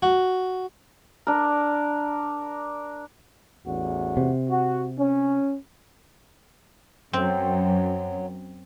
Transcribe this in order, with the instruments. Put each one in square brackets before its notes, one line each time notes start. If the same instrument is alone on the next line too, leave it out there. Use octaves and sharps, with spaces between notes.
[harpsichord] F#4
[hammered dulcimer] D4 A#4
[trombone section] A1 E2 F#4
[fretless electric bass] C3
[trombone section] F#4
C#4
[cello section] F#2 [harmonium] F#3 [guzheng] C4